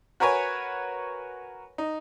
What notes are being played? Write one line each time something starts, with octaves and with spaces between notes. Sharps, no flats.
F#4 A#4 B4 C#5 G#5
D#4